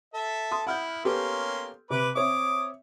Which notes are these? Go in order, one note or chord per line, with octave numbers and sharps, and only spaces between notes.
A4 E5
C6 D#6
E4 F#5 F6 G6
A#3 B3 C#4 G4 A4 C6
C3 B4 D6
C4 C#5 E5 D6 D#6